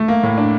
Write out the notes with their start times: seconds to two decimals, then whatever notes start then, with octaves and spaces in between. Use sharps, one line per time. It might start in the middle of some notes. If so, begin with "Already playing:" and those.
Already playing: A3
0.08 A#3
0.23 A2
0.38 D4